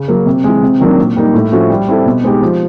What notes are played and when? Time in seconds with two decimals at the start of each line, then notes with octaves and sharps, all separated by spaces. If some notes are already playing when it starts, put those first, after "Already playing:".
Already playing: C#3
0.08 F#3 A#3
0.26 C3
0.44 E3 G#3
0.62 C3
0.80 D#3 F#3 A#3 D4
0.98 A#2
1.16 G3 A#3 D#4
1.34 A2
1.52 F3 A3 C#4 F#4
1.70 G3
1.88 C4 E4 A4
2.06 B2
2.24 G#3 B3 D#4 G4
2.42 F3